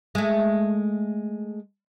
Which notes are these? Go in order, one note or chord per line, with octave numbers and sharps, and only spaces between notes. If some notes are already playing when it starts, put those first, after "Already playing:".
G#3 A3